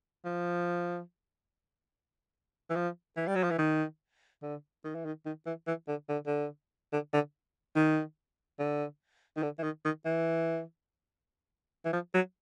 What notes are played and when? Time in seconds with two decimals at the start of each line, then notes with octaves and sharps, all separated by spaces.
0.25 F3
2.70 E3
2.76 F3
3.17 E3
3.27 G3
3.35 F#3
3.43 F3
3.51 E3
3.58 D#3
4.42 D3
4.84 D#3
4.95 E3
5.05 D#3
5.26 D#3
5.46 E3
5.67 E3
5.88 D3
6.09 D3
6.26 D3
6.93 D3
7.13 D3
7.76 D#3
8.59 D3
9.37 D#3
9.43 D3
9.59 E3
9.63 D#3
9.85 D#3
10.05 E3
11.85 E3
11.93 F3
12.14 F#3